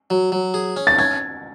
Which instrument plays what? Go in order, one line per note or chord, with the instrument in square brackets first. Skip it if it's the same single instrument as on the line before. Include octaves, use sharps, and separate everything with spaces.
[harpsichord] F#3
F#3
G#4
C#4
[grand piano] A6
[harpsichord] C#4 [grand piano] G#6